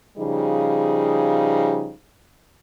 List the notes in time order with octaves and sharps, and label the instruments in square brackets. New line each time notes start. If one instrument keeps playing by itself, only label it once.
[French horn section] C#3 F3 G3 D#4 G#4